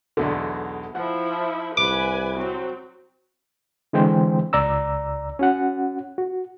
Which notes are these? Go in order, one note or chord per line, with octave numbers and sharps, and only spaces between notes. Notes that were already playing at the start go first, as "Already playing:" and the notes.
B1 E2 D3
F3 E4 F#5
C2 B4 G#5 D6
F#3 C4
D3 E3 G#3 C4 C5 G5
C#2 D5 A#5 E6
C#4 F#4 F#5
F#4